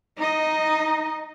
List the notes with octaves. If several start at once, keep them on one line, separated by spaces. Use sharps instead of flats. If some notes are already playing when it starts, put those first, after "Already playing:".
D#4 D#5